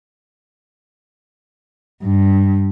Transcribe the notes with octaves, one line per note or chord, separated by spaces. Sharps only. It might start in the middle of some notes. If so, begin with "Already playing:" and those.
G2